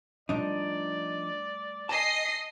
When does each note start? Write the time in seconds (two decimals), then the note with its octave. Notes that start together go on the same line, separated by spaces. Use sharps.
0.29 A2 F3 G3 D4 D#4 D5
1.89 D#5 G#5 A5 C7